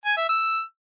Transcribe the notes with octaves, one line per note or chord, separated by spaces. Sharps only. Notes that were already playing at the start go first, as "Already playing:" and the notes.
G#5
E5
E6